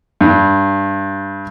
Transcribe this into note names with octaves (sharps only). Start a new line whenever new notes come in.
G2